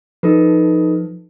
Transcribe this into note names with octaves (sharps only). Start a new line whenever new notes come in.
F3 D#4 A4 B4